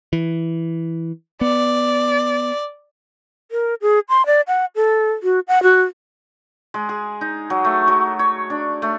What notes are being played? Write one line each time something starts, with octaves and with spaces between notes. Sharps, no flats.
E3
B3 D5
A#4
G#4
C6
D5
F#5
A4
F#4
F#5
F#4
G#3
G#4
D#4
F#3
A3
F#3
C#5
D4
A3